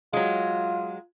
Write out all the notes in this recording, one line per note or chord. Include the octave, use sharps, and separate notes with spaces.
F#3 G#3 F4